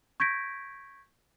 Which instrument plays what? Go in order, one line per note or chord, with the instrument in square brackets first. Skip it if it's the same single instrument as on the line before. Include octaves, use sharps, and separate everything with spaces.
[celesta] C#6 G6 G#6 A#6 B6 D7